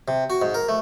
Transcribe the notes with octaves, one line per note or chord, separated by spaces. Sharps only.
C3
F#4
G#2
A#4
A3